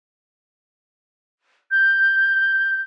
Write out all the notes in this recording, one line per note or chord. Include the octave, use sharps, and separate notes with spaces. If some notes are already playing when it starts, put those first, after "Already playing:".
G6